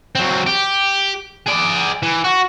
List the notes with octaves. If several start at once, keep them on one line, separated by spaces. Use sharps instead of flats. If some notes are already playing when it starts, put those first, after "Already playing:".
F#3 C4
G4
G#4 D5
E3
F#4